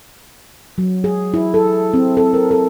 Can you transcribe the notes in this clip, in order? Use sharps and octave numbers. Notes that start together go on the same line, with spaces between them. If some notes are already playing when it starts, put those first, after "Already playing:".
F#3
G#4
E4
A4
C4
A4
A#4
A4